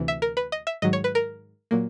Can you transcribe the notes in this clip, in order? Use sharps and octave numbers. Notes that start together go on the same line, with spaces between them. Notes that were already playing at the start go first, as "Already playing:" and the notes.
Already playing: D2 C3 E3
E5
A#4
B4
D#5
E5
G#2 D#3 F#3 D#5
C#5
B4
A#4
A#2 F#3 A#3